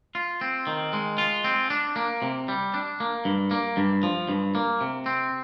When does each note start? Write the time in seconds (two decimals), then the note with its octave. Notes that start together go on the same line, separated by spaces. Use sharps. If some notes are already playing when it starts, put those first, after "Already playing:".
0.15 F4
0.41 C4
0.67 D#3
0.93 G#3
1.18 F4
1.44 C4
1.70 D4
1.96 A#3
2.22 C3
2.48 G3
2.74 D4
3.00 A#3
3.25 G2
3.51 A#3
3.77 G2
4.03 F3
4.29 G2
4.55 A#3
4.81 C3
5.06 C4